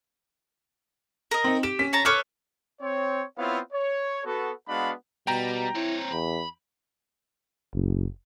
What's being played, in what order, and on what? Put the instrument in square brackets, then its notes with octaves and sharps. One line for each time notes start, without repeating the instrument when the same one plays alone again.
[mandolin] A#4 D#5
[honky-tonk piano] C4 D#4
[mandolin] G4 [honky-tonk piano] E7
[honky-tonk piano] C#4 B6
[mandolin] C#5 A5 A#5
[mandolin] A4 B4 C#5 [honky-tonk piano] C#6 D6 F6
[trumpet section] C4 C#5
B3 C4 E4 F4 C#5 F5
C#5
B3 F#4 A4
G#3 B3 D4 F#4 F5 B5
[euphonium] B2 [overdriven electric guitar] G3 [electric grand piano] G5 A#5
[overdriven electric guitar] C4 C#5 [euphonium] E4
[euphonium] E2 [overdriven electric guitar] B5
[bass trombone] F#1